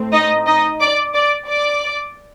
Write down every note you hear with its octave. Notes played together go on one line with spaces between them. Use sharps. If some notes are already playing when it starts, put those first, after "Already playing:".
Already playing: A2 A3 C4
D#4 D#5
D#4 D#5
D5 D6
D5 D6
D5 D6